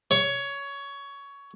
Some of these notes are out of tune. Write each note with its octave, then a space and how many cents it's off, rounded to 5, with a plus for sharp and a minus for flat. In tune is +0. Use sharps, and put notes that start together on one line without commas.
C#5 +15